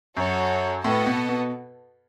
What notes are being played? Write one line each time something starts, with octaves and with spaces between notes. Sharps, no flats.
F#2 F#4 A4 C#5
A2 B3 F#4 A4 D#5 A5
B2
B2